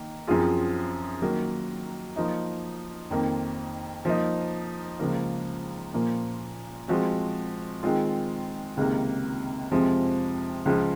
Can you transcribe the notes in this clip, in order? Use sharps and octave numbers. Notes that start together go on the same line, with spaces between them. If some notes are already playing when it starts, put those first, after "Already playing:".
Already playing: D#3 A#3
F#2 F3 C4 F4 G#4
D#3 F#3 A#3
F3 A#3 D#4
F2 D#3 A#3
F3 A#3 D#4
C#2 C#3 F3 A#3
A#2 F3 A#3
F3 G#3 C4 F#4
D#3 G#3 C4 F4
C#2 C3 D#3 A#3
F2 C3 F3 G#3
C#2 C#3 F3